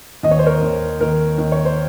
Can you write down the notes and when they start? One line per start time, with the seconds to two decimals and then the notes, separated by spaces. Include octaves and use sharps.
0.23 D#2 D#5
0.31 C#5
0.39 C5
0.46 A#4 C#5
0.62 D#2
1.01 D#2 A#4
1.38 D#2
1.52 C#5
1.65 C5